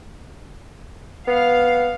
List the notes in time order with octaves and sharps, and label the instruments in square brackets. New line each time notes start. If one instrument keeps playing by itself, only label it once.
[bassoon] B3 [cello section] F5